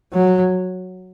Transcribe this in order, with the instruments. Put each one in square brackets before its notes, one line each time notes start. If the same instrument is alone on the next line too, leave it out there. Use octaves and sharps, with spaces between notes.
[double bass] F#3